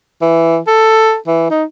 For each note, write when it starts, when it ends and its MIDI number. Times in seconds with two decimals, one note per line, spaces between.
0.21 0.58 52
0.67 1.16 69
1.27 1.47 52
1.50 1.64 63